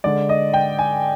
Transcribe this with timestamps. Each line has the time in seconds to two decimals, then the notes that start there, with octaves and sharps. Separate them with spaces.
0.04 D3 G#3 D5
0.29 D#5
0.53 G5
0.79 G#5